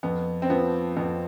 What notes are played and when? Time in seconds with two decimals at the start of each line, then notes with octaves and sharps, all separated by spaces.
0.03 F2 B3
0.42 C4
0.50 F3 B3
0.96 F2 B3